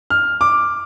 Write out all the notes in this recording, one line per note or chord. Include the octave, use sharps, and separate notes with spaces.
F6
D6